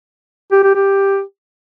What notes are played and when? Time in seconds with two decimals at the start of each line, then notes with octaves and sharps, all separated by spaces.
0.52 G4
0.63 G4
0.75 G4